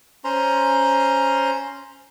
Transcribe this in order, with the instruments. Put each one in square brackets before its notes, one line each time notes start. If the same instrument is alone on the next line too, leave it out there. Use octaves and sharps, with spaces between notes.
[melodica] C#4 C5 A#5 C6